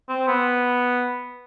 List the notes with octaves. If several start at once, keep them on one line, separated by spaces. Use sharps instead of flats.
C4
B3